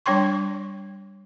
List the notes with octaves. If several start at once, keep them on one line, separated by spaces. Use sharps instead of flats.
G3 D4 C#5 G5 C6 C#6